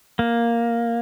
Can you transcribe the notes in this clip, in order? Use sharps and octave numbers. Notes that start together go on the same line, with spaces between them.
A#3